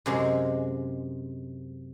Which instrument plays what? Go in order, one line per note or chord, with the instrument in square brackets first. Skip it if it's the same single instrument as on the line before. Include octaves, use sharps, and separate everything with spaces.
[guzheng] F#2 C3 G#3